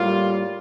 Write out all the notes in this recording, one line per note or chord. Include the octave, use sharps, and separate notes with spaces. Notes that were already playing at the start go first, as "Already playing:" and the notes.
Already playing: A2 G3 A#3 F4